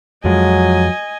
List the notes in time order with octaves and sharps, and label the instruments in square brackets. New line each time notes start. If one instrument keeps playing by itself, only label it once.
[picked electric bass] F2 F3 G#3 [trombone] F#3 [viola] D#5 G#5